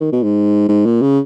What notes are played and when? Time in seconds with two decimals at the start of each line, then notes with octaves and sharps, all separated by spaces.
0.01 D#3
0.12 B2
0.23 G#2
0.68 G#2
0.85 A#2
1.02 C#3